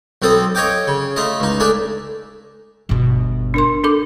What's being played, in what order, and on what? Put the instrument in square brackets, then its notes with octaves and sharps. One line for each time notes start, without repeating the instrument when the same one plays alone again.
[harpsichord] B1 C4 A4 D#6
C#5 D#5 F5 G5 D6
C#3
A3 F4 D#5
C#2 D#4
A3 D4 G#4 E5
[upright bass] G1 B2
[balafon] D4 A#4 C6
D4 A4 D6